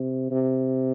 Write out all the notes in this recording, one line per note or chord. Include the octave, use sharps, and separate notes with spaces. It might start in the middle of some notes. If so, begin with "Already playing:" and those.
Already playing: C3
C3